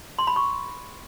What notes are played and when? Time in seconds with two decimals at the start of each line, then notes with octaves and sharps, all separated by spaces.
0.19 C6
0.27 B5
0.36 C#6